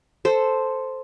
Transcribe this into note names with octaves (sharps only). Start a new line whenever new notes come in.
A4 C5